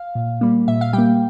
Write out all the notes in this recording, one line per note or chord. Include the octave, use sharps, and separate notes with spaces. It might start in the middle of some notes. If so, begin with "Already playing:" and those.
Already playing: F5
A#2
G3 A#3
A#2 E5
F5
G3 A#3 G5